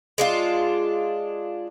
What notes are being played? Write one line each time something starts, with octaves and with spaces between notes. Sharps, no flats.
G#3 D4 F4